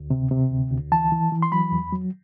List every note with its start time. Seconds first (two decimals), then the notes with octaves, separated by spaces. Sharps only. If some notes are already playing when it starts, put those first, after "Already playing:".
Already playing: D2
0.10 C3
0.31 C3
0.51 D2
0.71 D2
0.92 E3 A5
1.12 E3
1.32 E3
1.42 C6
1.52 F#3 B5
1.72 E2
1.93 F#3